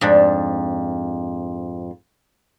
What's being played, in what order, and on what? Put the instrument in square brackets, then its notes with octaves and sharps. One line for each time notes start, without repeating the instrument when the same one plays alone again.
[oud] F2 G#2 D4